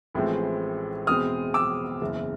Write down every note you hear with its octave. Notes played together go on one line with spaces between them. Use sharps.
A1 A2 F3 G#3 C4
E2 B2 G#3 C4 D#6 F6
D6 E6
F#1 E2 C#3